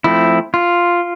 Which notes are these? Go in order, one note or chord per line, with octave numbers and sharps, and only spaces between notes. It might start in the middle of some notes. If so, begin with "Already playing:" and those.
F3 A3 C4 E4
F4